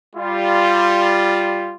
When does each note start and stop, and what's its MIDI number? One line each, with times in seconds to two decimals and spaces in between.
0.16 1.75 55
0.16 1.75 65